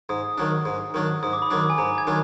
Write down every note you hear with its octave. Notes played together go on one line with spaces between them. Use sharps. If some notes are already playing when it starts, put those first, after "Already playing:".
G#2 D#6
D#3 F#3 D4
G#2
D#3 F#3 D4
G#2 D#6
D6
B5
D#3 F#3 D4 D6
G#5
G#2 A#5
G#6
D#3 F#3 D4